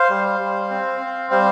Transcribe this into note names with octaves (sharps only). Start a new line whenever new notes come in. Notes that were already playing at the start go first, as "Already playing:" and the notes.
Already playing: C5 F5
G3
G3
C4
C4
G3 C5 F5